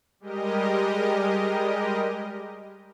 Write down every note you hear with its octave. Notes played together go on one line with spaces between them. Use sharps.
G3 G#3 G4 A#4 D#5